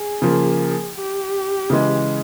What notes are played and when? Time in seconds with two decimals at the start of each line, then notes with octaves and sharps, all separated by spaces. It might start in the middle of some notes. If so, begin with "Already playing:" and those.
Already playing: G#4
0.22 C#3 F3 A#3
0.96 G4
1.70 C#3 E3 G#3